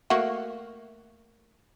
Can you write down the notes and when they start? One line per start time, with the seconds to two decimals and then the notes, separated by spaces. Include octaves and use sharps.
0.10 A3 A#3 F#4